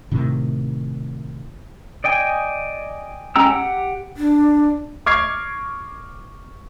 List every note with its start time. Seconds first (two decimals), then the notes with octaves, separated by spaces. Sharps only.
0.12 A2 C3 D#3
2.04 D5 D#5 G5 G#5
3.36 G#3 C#4 G5 A#5 E6
3.49 G4 F#5
4.17 D4
5.06 C#6 D6 F6 G#6 C7